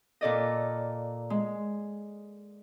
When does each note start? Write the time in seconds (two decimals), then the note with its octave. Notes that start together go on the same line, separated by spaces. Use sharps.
0.21 A#2 A4 D5 D#5
1.30 G#3